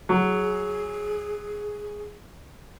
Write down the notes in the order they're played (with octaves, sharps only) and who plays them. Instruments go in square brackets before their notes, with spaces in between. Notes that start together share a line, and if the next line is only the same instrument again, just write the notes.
[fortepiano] F#3 [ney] G#4